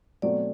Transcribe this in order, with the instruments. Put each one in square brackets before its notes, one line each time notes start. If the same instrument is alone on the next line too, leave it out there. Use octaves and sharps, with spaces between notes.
[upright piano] B2 F#3 A3 C4 [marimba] D5